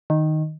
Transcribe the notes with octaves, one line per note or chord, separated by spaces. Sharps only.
D#3